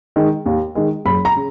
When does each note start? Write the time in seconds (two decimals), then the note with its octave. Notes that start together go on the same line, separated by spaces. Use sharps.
0.16 D#3 G#3
0.46 D#2
0.75 D#3 G#3
1.05 F#1 B5
1.25 A#5
1.36 C#3